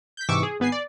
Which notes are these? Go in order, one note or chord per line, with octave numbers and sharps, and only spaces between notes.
G6 B6
G#2 C3 E3 C#6 D6 E6
G#4
G#1 B3 B4 G#5 C7
D5